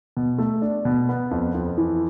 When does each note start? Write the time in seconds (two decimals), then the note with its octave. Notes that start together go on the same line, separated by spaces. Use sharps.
0.17 B2
0.38 A3
0.62 D4
0.85 B2
1.09 B3
1.31 F2
1.55 F2
1.78 E3